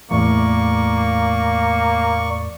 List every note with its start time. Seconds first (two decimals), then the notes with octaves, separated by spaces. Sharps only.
0.11 E2 A2 A#3 D5 C#6